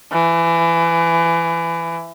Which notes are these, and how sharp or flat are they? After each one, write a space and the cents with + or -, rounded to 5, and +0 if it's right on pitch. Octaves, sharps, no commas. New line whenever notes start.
E3 +20